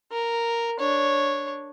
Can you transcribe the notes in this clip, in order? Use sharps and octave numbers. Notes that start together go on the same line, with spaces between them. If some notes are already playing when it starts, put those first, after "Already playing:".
A#4
D4 C#5